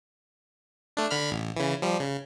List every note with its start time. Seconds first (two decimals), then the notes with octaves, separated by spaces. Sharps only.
0.97 A3 D4
1.11 D3 B5 F6
1.31 A1
1.56 C#3 E3
1.82 F3 G3
2.00 C#3